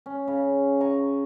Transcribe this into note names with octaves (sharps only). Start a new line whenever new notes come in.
C#4
C#3
G#5 A#5 C#6